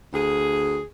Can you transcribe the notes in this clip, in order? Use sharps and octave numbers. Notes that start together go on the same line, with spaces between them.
D2 G#4